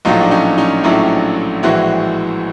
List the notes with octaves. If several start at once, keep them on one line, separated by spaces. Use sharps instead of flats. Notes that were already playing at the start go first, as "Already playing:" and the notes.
A#1 A2 F#3 A3 D#4 F4
D4
C#4 D#4
C#4 D#4
A#1 A2 F#3 A3 D4 E4
A#1 A2 E3 G#3 E4 F#4